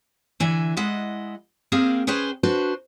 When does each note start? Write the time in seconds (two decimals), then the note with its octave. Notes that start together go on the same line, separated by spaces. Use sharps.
0.40 D3 E3 E5 G#5
0.77 G#3 E4 D#5 F#5
1.72 A#3 C4 G#4 A#4 F5 G5
2.07 C#4 G#4 B4 C5 G5
2.43 D4 F#4 B4 C5